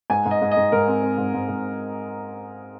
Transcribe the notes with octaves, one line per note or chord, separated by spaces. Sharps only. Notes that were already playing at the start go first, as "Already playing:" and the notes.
G#2 G#5
G#2
D#5
G#2
D#5
G#2
G#2 A#4
C4
C4
G#2
G#2
G#2